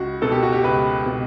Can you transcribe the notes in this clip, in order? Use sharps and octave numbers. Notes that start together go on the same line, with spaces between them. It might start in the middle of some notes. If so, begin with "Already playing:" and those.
Already playing: C#2 F#4
B2 A4
G4
F#4
G4
C#2 B4
B2